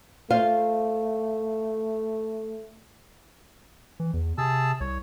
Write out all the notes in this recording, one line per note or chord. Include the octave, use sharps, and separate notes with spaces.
A3 F4 C5 F5
E3
E2
C3 G#4 A5 E6
C2 C#5